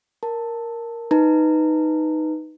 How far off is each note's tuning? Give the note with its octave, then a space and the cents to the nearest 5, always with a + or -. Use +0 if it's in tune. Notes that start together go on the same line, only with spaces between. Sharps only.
A#4 +0 A5 +10
D#4 +0 B4 +0 A#5 -30